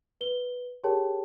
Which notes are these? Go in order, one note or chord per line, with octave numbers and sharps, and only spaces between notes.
B4 G7
G4 G#4 A#4 C#5 G5 A5